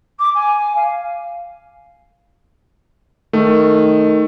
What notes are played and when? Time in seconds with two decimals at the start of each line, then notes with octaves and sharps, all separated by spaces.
0.19 D6
0.34 G#5
0.75 F5
3.33 D#3 A3